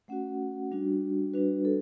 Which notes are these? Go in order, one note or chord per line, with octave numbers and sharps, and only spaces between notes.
A3 C#4 F#4 F#5
G3 D4 F#4
G3 D4 F#4 B4
A4